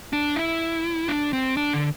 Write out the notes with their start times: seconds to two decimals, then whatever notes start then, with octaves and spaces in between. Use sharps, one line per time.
0.13 D4
0.36 E4
1.08 D4
1.33 C4
1.57 D4
1.73 D3